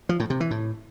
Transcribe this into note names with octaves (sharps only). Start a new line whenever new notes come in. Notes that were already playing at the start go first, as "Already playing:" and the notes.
F3
A2
C3
E3
A2